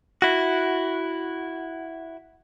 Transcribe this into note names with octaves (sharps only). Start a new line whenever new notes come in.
E4 F#4